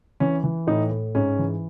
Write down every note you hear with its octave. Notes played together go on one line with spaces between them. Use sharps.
E3 C#4
E3
A2 D#4
A2
G#2 C#4
E3